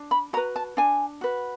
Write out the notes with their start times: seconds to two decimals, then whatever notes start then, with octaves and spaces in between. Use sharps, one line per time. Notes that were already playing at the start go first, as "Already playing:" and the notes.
Already playing: D4
0.11 B5
0.33 F#4 A#5
0.37 B4
0.56 A5
0.77 D4 G#5
1.21 F#4 B4